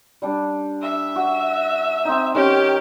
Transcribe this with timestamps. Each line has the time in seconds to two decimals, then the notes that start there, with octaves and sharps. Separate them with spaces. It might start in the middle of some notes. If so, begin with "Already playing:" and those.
0.22 G3 D4
0.82 E5
1.16 F#4
2.05 C4 D#4
2.35 D#3 C#4 G4